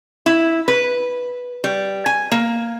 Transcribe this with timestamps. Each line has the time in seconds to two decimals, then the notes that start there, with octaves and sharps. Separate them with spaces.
0.26 E4
0.68 B4
1.64 G3
2.06 G#5
2.32 A#3